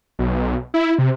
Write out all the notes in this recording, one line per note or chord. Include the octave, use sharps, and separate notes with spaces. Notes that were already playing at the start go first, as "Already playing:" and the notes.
B1
E4
C3